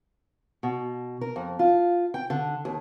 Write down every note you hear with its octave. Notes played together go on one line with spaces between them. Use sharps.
B2
A#4
F2
F4
G5
D3
D#2